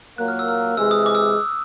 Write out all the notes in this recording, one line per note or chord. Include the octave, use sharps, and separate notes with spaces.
A#2 F#3 A#3 F#6
F6
E6
F6
C3 E3 G#3 E6
D#6
D6
E6